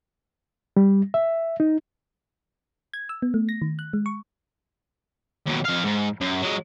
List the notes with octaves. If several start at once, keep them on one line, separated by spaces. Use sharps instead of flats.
G3
E5
D#4
G#6
E6
B3
A3
A#6
D#3
F#6
G#3
C#6
D#2 B2
F2 F5
G#2
F#2
F#3 G#3